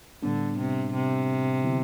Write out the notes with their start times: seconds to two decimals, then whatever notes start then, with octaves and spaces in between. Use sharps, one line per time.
0.22 A2 D3 G3 B3 D4
0.58 C3
0.93 C3
1.64 D3 F#3 B3 E4